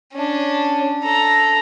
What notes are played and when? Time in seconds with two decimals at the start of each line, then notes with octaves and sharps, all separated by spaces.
0.13 C#4 D4
1.03 A4 A#5